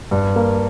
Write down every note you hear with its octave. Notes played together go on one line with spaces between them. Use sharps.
G2
A#3